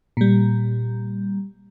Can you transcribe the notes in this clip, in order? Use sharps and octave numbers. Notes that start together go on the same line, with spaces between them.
A#2 G3